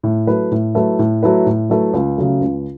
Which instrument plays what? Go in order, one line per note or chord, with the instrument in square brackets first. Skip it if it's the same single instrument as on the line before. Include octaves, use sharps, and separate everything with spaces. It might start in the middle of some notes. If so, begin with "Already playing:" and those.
[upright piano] A2
F#3 A3 E4 B4
A2
F#3 A3 E4 B4
A2
F#3 A3 E4 B4
A2
F#3 A3 E4 B4
C#2
C#3 F#3 A3
C#2